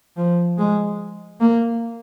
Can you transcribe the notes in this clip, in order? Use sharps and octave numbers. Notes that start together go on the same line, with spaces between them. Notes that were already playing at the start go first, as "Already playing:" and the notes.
F3
G#3
A#3